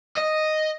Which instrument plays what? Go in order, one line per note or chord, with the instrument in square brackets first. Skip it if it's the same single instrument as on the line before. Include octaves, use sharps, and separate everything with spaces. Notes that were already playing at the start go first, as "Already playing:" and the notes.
[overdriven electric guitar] D#5